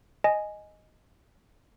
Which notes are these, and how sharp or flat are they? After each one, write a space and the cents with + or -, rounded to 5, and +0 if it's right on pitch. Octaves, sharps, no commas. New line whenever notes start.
D#5 +0 G#5 +5